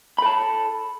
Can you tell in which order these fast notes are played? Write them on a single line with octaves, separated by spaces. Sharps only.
B5 A4 A5